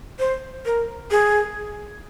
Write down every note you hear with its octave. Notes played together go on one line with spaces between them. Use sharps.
C5
A#4
G#4